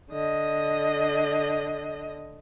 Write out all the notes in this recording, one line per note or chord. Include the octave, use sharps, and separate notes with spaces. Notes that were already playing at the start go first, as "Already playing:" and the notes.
D3 D#5